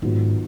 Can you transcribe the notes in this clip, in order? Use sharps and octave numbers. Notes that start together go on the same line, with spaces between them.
G#2 D#3 F#3 B3 F4